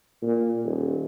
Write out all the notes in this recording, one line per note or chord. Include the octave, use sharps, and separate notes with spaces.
A#2
D#1